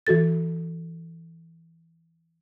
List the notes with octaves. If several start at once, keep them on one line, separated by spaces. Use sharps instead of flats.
E3 F#4 A4 A6